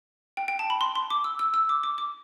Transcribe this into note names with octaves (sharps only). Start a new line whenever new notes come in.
G5
G5
A5
B5
C6
C6
D6
E6
E6
E6
D6
D6
D6